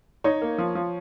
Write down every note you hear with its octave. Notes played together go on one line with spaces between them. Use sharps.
D#4 C#5
A#3
F3
F3